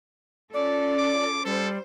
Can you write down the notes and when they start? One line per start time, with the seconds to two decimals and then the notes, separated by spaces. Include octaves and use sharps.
0.53 C#4 F4 A4 D5
0.99 D6
1.45 G3 A4 C5